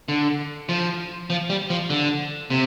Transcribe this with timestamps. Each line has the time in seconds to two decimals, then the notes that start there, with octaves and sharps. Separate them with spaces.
0.08 D3
0.69 F3
1.30 F3
1.50 G3
1.70 F3
1.90 D3
2.50 C3